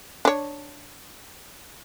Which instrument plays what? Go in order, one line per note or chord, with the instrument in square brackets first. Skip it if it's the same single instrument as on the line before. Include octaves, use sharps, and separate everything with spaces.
[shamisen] D4 C#5